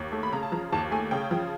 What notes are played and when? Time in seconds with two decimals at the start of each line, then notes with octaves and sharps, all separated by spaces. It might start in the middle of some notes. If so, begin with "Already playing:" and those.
Already playing: D#2
0.12 A3
0.23 B5
0.32 C#3 A#5
0.43 A5
0.52 F3 A#5
0.72 D#2 A5
0.91 A3 G#5
1.11 C#3 G5
1.31 F3